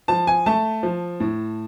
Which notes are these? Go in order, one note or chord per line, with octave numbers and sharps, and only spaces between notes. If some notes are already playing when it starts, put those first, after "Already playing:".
F3 A5
G#5
A3 A5
F3
A2